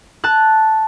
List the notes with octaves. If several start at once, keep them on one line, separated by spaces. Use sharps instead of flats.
A5 F#6